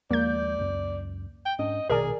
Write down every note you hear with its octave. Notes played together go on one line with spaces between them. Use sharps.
D#2 F3 G#3 A#3 D5 G6
C#2 F#2
G5
G#2 C#4 D4 D#5
A#1 B2 D#3 G#4 A#4 D5 G#5